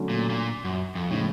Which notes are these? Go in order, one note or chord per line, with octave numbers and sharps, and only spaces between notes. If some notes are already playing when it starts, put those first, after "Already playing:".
Already playing: D3 F#3 A3 C#4
A#2
A#2
F#2
F2
A2 C#3 F3 G#3